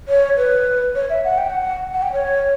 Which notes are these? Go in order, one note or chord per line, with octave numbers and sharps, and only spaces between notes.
C#5
B4
C#5
E5
F#5
G5
F#5
F#5
G5
C#5